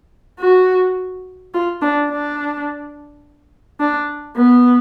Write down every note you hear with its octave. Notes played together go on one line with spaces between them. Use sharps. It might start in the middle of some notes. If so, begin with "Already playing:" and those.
F#4
F4
D4
D4
D4
B3